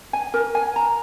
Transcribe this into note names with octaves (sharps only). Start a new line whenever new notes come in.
G#5
A#4
G#5
A#5